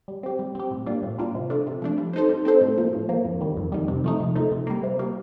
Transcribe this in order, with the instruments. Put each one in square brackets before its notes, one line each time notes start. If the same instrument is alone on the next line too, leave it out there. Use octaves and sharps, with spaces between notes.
[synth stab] G3
C4 G4
G3
C4 G4
A2
G3 A#3 D4 F4
A2
G3 A#3 D4 F4
C3
F3 A3 D4
C3
F3 A3 D4
G3
C4 D#4 A4 C5
G3
C4 D#4 A4 C5
A2
F3 A#3
A2
F3 A#3
F2
D#3 G3
F2
D#3 G3
C3
F3 A3 D#4
C3
F3 A3 D#4
C3
G3 A#3
C3
G3 A#3